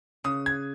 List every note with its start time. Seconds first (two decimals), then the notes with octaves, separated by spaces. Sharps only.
0.24 C#3 D#6
0.46 G#6